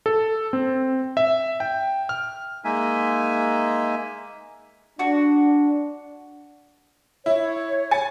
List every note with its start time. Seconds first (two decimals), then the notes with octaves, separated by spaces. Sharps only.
0.06 A4
0.53 C4
1.17 E5
1.60 G5
2.09 F6
2.64 G#3 A#3 D#4 E5 G#5
4.99 D4 F#4
7.26 E4 C#5
7.91 G#5 A6 C#7